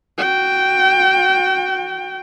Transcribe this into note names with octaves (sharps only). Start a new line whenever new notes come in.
F#4 G5